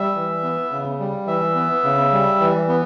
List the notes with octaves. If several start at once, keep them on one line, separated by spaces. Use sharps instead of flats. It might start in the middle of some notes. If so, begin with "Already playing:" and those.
Already playing: G3 E5
E3
B3
C#3
G3
E3 E5
B3
C#3
G3
E3
B3